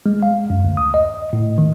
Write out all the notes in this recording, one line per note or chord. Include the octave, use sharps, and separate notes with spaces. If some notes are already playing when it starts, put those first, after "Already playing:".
G#3
F5
F#2
D2
D#6
D#5
A2
D#3